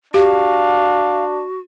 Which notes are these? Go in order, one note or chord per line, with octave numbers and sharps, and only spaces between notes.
D4 F#4 G4 F5